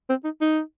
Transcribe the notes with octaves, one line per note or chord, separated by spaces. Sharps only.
C4
D#4
D#4